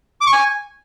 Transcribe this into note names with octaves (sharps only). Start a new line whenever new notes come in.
D6
C#6
G#5